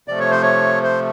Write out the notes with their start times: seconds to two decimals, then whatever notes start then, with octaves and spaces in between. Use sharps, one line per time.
0.08 C3 F3 A3 D5
0.20 C#5
0.31 C5
0.42 C#5
0.83 C5